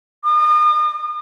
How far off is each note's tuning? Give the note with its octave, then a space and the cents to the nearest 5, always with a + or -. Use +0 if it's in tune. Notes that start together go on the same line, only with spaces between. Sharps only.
D#6 -40